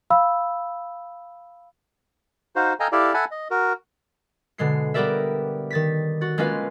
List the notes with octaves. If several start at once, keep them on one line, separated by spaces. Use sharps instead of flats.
F5 B5 E6
D#4 F#4 C5 F5
A4 D#5 F5 G5 G#5 A#5
E4 G4 A4 D5 F5
A4 E5 F#5 G#5 A5 B5
D#5
F#4 A#4
B2 D3 G#3 C7
G3 B3 G4 A#4 D5 E5
D#3 A6 B6
F#4 A6
G#3 A#3 C#4 F4 B4 F5